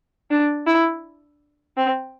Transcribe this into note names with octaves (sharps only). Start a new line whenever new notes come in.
D4
E4
C4